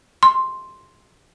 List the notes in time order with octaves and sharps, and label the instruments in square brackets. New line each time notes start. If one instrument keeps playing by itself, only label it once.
[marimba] C6